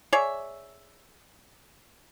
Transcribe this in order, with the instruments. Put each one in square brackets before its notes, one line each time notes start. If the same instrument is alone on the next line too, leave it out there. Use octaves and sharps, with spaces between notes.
[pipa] G#4 C#5 D5 E5